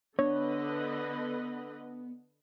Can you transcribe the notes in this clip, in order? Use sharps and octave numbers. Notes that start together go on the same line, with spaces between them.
D3 B3 D4 B4 C#5 D#5